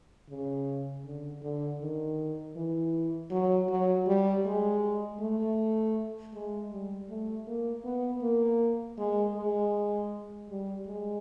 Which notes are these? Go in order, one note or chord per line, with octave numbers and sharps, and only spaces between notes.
C#3
D3
D3
D#3
E3
F#3
F#3
G3
G#3
A3
G#3
G3
A3
A#3
B3
A#3
G#3
G#3
G3
G#3